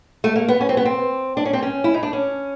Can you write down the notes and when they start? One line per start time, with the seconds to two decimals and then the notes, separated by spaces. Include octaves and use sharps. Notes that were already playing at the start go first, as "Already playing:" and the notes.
0.24 A3
0.35 A#3
0.49 B3
0.61 C#4
0.69 C4
0.77 B3
0.85 C4
1.37 D4
1.45 C#4
1.53 C4
1.63 C#4
1.84 E4
1.94 D#4
2.03 D4
2.13 C#4